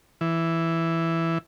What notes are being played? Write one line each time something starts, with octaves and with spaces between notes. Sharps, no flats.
E3